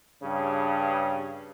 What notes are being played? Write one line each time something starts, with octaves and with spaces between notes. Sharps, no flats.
G2 C#3